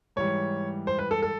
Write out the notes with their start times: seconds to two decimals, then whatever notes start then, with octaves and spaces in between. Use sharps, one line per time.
0.16 G#2 E3 G3 C#5
0.87 C5
0.99 B4
1.11 A4
1.22 A4